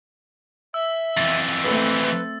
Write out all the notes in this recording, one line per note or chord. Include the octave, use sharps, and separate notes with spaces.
E5 E6
F2 E3 A6
A3 C4 A4 B4